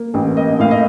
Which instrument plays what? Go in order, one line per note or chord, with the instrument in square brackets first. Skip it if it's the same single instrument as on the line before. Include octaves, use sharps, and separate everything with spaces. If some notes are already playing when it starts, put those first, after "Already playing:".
Already playing: [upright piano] A#3
A1
A#3 D#5
A2 F5
D#5